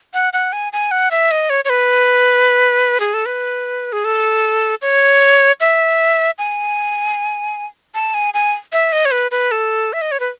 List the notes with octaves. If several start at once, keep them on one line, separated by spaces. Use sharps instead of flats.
F#5
F#5
G#5
G#5
F#5
E5
D#5
C#5
C#5
B4
G#4
A4
B4
G#4
A4
C#5
E5
G#5
A5
G#5
G#5
E5
D#5
C#5
B4
B4
A4
E5
D#5
C#5
B4